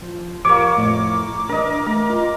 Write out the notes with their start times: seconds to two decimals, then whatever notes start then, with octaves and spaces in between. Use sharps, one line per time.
0.02 F3
0.45 F2 F3 A#3 G4 C#5 D6
0.76 F2 A2
1.49 E3 D4 A#4 D#5
1.86 A3 A#4
2.09 F4 D#5 G5